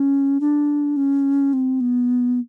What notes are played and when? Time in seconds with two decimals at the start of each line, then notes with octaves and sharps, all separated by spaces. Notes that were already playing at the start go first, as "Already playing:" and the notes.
Already playing: C#4
0.41 D4
0.97 C#4
1.53 C4
1.81 B3